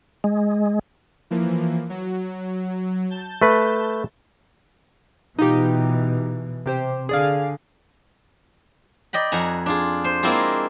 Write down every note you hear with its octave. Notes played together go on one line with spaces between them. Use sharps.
G#3
E3 F3 A#3
F#3
A5 G6
A3 B4
B2 E3 D#4 F4 G4
C3 G4 C5
D3 G#4 D5 F5
D5 D#5 G5 B5
F2 F#5 G#5 A#5
D4 F4 G#4
C5
G#3 A#3 C4 E4 F4 G#4